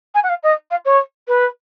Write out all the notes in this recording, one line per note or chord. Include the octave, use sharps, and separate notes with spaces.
G#5
F#5
F5
D#5
F5
C#5
B4